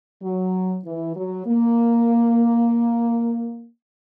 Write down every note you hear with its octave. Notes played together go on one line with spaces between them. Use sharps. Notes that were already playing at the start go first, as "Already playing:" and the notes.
F#3
E3
F#3
A#3